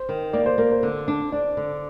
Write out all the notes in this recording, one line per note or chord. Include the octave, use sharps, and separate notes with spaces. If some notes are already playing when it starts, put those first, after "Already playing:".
Already playing: C5
D#3
A#3 D5
C5
A#3 A#4
C5
D3
D4
D4 D5
D3